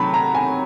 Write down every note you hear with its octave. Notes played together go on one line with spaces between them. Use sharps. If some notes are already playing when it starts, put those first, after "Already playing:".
Already playing: C3 D#3 F#3 A5 B5
A#5
G#5